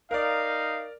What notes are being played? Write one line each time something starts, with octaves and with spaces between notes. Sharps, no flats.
D#4 A#4 D5 F5